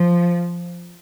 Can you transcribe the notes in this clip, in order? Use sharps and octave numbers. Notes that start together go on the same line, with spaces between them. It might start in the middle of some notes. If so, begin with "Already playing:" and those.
Already playing: F3